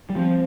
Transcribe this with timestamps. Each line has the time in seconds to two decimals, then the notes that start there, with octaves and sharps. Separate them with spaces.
0.10 G3
0.16 F3 C4